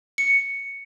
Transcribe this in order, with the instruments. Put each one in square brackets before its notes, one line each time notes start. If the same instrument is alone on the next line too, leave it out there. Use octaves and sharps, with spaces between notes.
[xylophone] C#7